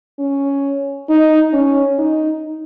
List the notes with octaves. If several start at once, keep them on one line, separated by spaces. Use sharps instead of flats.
C#4
D#4
C#4
D#4